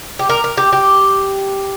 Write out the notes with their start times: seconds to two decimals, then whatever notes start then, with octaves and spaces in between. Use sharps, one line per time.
0.19 G4
0.29 A#4
0.44 A#4
0.57 G4
0.73 G4